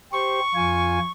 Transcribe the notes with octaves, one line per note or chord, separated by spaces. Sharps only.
G4 C5 C#6
F2 F4 G#5